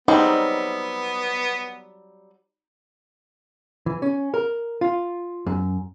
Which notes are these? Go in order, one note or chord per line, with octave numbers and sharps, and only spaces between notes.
F#3 G3 B3 C4 D#4
E3
C#4
A#4
F4
F#2